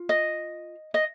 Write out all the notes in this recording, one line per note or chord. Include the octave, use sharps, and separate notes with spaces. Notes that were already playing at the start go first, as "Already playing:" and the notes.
Already playing: F4
D#5
D#5